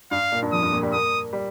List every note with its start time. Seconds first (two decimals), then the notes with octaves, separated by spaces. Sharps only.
0.11 G2 F5
0.32 A#2
0.42 G2
0.52 F2 D#6
0.63 G2
0.72 A#2
0.82 G3
0.93 A#3 D#6
1.33 G3